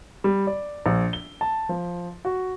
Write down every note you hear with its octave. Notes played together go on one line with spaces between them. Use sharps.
G3
D5
A#1
G7
A5
F3
F#4